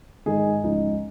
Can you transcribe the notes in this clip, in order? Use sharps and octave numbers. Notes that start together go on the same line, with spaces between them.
G#2 D#3 G#3 D#4 G#4
C#2 C#3 F3 G#3 D#4